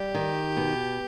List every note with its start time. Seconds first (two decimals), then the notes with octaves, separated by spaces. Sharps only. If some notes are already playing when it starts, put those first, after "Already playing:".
Already playing: G3 G4
0.15 D#3
0.57 B2